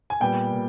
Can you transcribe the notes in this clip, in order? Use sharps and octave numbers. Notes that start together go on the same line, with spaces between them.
G#5
A#2 G3 B3 G5
A#2